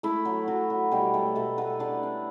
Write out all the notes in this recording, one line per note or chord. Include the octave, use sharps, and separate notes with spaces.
A3 E4
F#3
F#3 F#4
F#3
B2 G3 G4
F#3 A3 A4
B2 A3 A4
A3 B3 B4
A3 D4 D5
D4